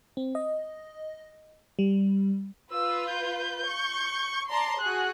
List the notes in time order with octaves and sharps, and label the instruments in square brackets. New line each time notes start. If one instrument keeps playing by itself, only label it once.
[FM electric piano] C4
D#5
G3
[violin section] F4 B4 [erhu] E6
[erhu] G6
[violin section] C#6
[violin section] D5 A5 C6 [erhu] A#5
[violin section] F#4 G#4 [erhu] F#6